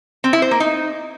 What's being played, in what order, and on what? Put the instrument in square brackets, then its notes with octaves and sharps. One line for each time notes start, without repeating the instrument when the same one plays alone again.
[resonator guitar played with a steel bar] C4
E4
C5
A#3
D#4